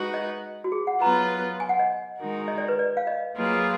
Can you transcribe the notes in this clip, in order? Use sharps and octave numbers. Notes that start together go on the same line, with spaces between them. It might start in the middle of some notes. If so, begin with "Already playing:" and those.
Already playing: G#3 D#4 F#4 B4
D#5
F#4
G#4
F#5
F#3 B3 F4 B4 A#5
G#5
F#5
D#5
D#3 G#3 D#4 F#4 A#4
D#5
D5
B4
D5
F5
D#5
F#3 A#3 F4 G#4 B4